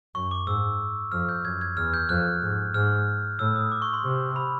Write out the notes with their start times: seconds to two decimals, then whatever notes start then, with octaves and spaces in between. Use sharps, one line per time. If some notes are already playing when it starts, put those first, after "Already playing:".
0.15 F#2 C#6
0.31 D6
0.47 G#2 E6
1.12 F2 F6
1.29 G6
1.45 F#2 G#6
1.61 G#6
1.77 E2 F6
1.94 G6
2.09 F2 F#6
2.42 G#2
2.74 G#2 F6
3.39 A2 E6
3.56 D#6
3.72 D6
3.82 C#6
3.94 C6
4.04 C3
4.36 B5